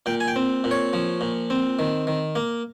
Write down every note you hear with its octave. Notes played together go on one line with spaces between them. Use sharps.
A#2 G5
G#5
G5
C4
A#2
C#5
F3
A#2
C4
D#3
D#3
A#3